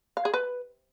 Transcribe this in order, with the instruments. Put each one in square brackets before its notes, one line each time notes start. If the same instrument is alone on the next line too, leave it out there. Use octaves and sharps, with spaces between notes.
[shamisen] F5
G#4
B4